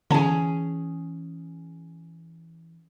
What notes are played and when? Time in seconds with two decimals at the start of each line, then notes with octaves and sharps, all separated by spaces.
0.11 D3 E3 C#4 G#4 A5